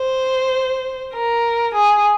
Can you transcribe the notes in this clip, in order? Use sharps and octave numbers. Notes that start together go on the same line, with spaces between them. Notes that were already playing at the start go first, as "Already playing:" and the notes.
Already playing: C5
A#4
G#4